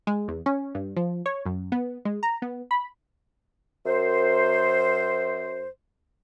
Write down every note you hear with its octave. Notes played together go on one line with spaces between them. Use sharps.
G#3
E2
C#4
G2
F3
C#5
F#2
B3
G#3
A#5
B3
B5
F#2 C5